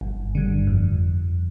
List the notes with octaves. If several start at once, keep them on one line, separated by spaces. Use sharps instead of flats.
G1
G2 D3
F2